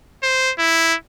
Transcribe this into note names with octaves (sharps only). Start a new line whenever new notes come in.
C5
E4